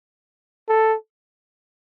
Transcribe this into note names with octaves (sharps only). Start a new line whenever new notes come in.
A4